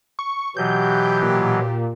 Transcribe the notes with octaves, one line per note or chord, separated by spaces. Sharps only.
C#6
B2 E3 F#3 G4 G6
A#2